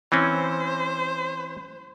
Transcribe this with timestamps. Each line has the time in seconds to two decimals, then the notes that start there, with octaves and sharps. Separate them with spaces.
0.12 E3 C4 C#4 C5